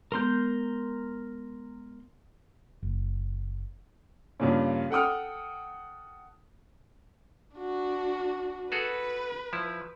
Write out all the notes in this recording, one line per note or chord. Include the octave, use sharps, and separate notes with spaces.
G#3 B3 A#4 C6 G6
F#1
G2 A#2 C#3
A4 F#5 G5 D#6 F6
D4 F#4
F#4 G#4 A4 B4
F3 E4